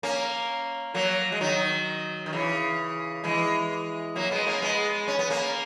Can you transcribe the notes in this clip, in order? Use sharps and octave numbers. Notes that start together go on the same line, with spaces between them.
A#3 C#4
F#3 A#3
G#3
D#3 F#3
D#3
C#3 E3
E3 G#3
F#3 A#3
G#3 B3
A#3 C#4
G#3 B3
C#4
B3
A#3 C#4